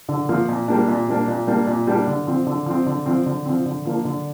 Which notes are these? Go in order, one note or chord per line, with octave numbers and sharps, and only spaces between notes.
D3
F3 A#3 F4 A#4
A#2
G3 A#3 D4
A#2
G3 A#3 D4
A#2
G3 A#3 D4
A#2
G3 A#3 D4
D3
F3 C4
D3
F3 C4
D3
F3 C4
D3
F3 C4
D3
F3 A#3 D4
D3